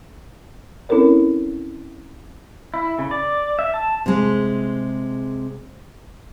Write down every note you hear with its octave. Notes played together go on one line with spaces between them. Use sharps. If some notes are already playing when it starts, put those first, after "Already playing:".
C4 C#4 E4 A4 A#4 C#5
E4
C#3
D5
E5
A5
C3 G#3